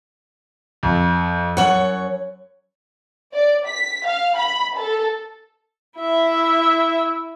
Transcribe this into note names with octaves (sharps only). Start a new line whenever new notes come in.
F2
F#2 C#5 F#5 C#6 F#7
D5
B6
F5
B5
A4
E4 E5